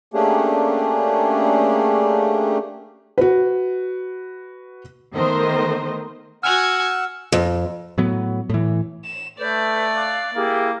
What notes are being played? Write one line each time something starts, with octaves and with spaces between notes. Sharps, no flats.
A3 A#3 C#4 D4 G4 G#4
F#4 B4
D#3 A3 B3 A#4 C5 D#5
F#4 F#5 G#5 E6 F6
F2
A2 F#3 B3
A2 E3
E7
A3 A4 B4 D5 G6
F5 D6 F#6
A#3 E4 G4 G#4